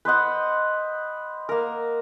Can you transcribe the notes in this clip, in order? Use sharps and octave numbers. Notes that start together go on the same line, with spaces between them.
B4 C5 D#5 F#5
A#3 A#4